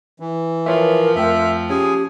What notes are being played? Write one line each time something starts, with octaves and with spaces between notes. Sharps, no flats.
E3
F3 A#4 B4 C#5 E5
F2 A3 E5 G5
C#4 G4 G#4 G#5